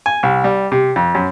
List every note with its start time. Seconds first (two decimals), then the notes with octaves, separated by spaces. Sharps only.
0.06 G#5
0.23 C2
0.44 G3
0.72 C3
0.96 F2
1.15 F#2